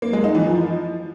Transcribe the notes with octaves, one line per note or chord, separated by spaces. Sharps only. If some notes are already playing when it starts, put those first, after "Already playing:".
A#3
G#3
D#4
E3
F3